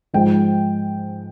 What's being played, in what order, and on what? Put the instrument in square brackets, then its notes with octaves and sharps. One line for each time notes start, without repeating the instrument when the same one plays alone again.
[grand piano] G#2 F3 G#3 G5